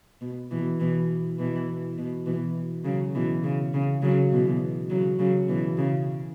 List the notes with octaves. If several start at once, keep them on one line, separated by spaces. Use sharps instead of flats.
B2
B2 E3
B2 E3
B2 E3
B2
B2 E3
C#3 F#3
B2 E3
C#3
C#3
C#3 F#3
B2 E3
C#3 F#3
C#3 F#3
B2 E3
C#3